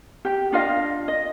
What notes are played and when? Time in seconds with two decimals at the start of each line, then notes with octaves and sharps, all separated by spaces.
0.25 G4 G5
0.52 D4 F4 D#5 F5
1.08 D#5